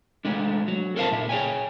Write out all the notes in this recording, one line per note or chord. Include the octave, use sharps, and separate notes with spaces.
G#3 A3 D4
F#3
A4 A#4 C5 F5 F#5 A5
A#2 E5
G#4 C#5 G5 G#5